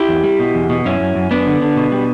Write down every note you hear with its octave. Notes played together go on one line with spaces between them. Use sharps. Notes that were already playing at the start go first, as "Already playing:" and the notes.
Already playing: E4 G4
E2
G3
B2
E2
B2
F#2 C#4 E4
F#2
F#2
F#2 B3 D4
D3
D3
B2
G3